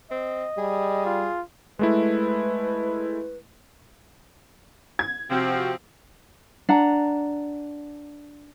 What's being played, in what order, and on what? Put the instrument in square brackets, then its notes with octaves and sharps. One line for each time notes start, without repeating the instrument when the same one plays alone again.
[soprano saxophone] C4 [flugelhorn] D#5
[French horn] G3 [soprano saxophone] G#4
[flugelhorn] F4
[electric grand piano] G#3 A3 E4 [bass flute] B4
[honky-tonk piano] G#6
[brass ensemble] C3 F#4 [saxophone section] F3 C4
[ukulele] D4 F#5 A#5